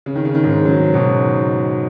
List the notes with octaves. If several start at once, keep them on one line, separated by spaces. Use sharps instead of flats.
C#3
D#3
C#3
D#3
G#2 C#3
C#3 F#3
C#3
B2 D#3